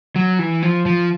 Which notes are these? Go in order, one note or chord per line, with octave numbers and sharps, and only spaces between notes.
F#3
E3
F3
F3